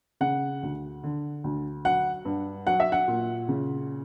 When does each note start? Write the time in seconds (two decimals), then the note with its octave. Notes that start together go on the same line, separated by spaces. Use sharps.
0.21 C#3 F#5
0.63 D2
1.04 D3
1.44 D2
1.85 F#3 F#5
2.25 G2
2.67 F#3 F#5
2.80 E5
2.92 F#5
3.08 A#2
3.48 C#3